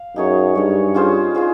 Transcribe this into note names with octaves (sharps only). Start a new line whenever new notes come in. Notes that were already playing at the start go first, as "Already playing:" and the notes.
Already playing: F5
F#2 D#4 G#4 C#5
G2 D#4 G#4 C#5
C#4 F4 G#4 C5
F4 G#4 C5